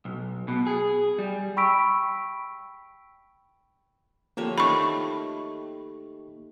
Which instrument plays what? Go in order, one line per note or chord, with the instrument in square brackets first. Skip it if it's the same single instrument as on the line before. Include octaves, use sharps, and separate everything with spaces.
[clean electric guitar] B1
B2
G#4
G3
[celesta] G5 B5 C#6 E6 B6 D7
[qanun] D3 F3 C#5 [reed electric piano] A#3 G4 A4
[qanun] D#3 A3 D6 [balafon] B5 C#6